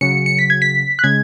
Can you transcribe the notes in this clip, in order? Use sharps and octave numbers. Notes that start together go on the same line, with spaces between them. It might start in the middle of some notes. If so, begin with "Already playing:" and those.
C#3 F#3 C#7
C#7
B6
G#6
B6
F#6
C#3 G#3 G#6